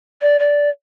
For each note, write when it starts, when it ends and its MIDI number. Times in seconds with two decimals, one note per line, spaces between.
0.22 0.39 74
0.39 0.69 74